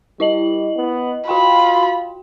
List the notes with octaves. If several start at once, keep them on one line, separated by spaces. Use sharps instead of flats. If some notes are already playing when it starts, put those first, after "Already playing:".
G3 E4 D#5 F#7
B3
F4 F#4 G5 B5 C6